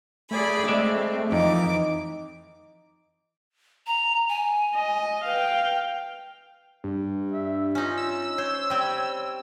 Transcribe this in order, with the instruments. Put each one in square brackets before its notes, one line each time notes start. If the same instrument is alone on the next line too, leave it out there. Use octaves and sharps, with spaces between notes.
[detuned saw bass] A3 [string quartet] G#4 D5 B5
[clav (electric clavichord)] G#3 D5 E5 [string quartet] C4
[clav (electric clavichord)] F2 [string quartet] E3 D6 [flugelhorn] D#4
[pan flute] A#5
G#5
[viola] D#5
[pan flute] B4 [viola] F5 G5
[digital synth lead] G2
[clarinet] E5
[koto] C#4 D#4 [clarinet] F4
[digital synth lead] E6
[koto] C5 [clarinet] C#5
[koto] G3 C4